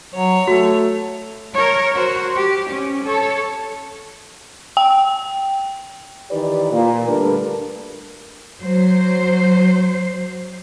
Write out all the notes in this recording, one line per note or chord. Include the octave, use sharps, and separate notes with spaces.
F#3 C#5
A3 F#4
A#4 C#5
F#4 C5
G4
C#4
A4 C#5
G5
D#3 E3 G4 B4 D5
A#2
D3 G3 A3 D4 A#4 B4
F#3 C5